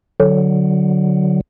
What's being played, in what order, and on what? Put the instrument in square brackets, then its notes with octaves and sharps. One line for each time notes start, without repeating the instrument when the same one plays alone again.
[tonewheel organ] D3 F#3